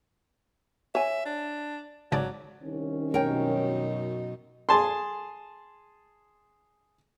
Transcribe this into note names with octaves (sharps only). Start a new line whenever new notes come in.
C#5 E5 G#5
D4
G#1 C#3 F#3 D5 A5
C2 D#3 C#4
F#2 B2 D#4 A#4 C#5 G5
G#4 A5 C6